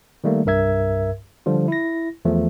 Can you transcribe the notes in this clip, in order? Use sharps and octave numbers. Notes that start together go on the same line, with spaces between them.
D#3 G3 A3 A#3
C2 G2 A#4 E5 G#6
D3 F3 G3 F4
E4 A#6
E2 F3 A3